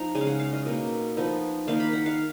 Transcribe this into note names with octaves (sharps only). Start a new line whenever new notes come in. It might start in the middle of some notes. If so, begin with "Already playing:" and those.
Already playing: F3 D#4 A#5
C#3 G#3 C#4 G#5
F5
F#5
F5
D#5
B2 A#3 D#4
F3 B3 D#4
D#3 A#3 D#4 F5
B5
F#5
F5